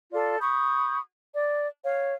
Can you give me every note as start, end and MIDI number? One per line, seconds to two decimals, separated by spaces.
0.12 0.36 65
0.12 0.36 69
0.12 0.36 74
0.39 0.97 83
0.39 0.97 85
0.39 0.97 87
0.39 0.97 91
1.34 1.65 74
1.83 2.13 73
1.83 2.13 77